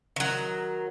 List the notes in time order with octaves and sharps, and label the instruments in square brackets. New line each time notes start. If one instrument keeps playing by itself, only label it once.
[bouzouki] D#3 F#3